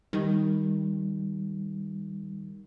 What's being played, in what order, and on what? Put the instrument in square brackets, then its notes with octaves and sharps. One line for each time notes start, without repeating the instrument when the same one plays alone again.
[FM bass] D#3 [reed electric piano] G3